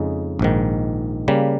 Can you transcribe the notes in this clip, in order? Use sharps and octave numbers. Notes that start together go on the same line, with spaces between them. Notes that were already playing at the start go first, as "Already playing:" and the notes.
Already playing: F2 C#3 G#3 D#4
A#1 G#2 D#3
C#3 G3 A#3